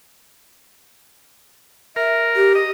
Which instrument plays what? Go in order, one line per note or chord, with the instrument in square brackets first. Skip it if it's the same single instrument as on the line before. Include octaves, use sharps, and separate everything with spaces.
[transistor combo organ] A#4 [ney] E5
[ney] G4
[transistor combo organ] D#5